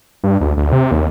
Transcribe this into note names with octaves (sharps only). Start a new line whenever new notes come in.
G2
D2
D2
C3
D#2